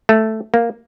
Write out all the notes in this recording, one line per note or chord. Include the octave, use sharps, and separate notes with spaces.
A3
A#3